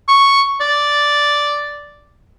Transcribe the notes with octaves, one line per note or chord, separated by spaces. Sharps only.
C#6
D5